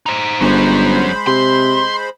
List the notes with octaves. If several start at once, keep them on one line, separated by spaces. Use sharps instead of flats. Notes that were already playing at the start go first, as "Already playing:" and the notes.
D#4 C5
G1 F#3 G#3 C#4 C5 B5
C3 C6